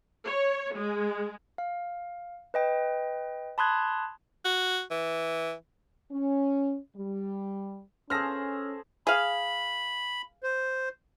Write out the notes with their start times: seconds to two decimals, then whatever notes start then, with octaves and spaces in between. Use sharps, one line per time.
0.24 C#5
0.74 G#3
1.58 F5
2.54 B4 D#5 G5
3.58 A5 B5 C6 D#6 F#6 G#6
4.45 F#4
4.91 E3
6.12 C#4
6.96 G3
8.10 C#4 G#4 A4 C5 F6 A#6
9.07 G#4 F5 B5
10.43 C5